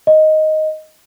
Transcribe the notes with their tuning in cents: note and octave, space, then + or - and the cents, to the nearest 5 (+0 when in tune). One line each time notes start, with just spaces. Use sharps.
D#5 +5